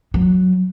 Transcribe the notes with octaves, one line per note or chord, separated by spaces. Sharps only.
F#3